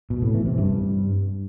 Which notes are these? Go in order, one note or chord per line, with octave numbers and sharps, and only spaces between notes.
B2
A2
E3
C3
G2